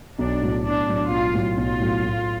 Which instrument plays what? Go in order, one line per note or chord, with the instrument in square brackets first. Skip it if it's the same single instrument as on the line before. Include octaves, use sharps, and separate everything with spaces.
[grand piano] B1 [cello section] D4
[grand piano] A2 F#3
[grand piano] B1 [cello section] D4
[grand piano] A2 F#3
[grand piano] B1 [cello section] F4
[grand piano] A2 F#3
[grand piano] B1 [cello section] F4
[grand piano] A2 F#3
A2